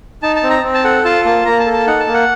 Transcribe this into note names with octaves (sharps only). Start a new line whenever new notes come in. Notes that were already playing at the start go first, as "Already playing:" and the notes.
D#4 A5
A5
C4
A#5
C4
A5
A4 F#5
F4 A5
A#3 A5
A#3 A#5
A5
A4
A5
D#4 F#5
A5
A#3
F#5